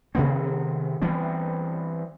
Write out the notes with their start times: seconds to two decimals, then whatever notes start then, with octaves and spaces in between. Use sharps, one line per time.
0.15 C3 D#3 B3 C4
1.02 E3 G3 B3 C4